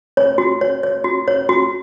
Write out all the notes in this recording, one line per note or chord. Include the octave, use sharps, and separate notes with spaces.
C#5
F#4
C#5
C#5
F#4
C#5
F#4